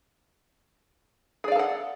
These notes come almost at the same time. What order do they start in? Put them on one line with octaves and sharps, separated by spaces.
G#4 D5 F5 A4 F#5